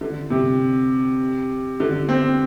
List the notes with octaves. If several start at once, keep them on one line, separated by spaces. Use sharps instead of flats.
D3
C3
D3
C4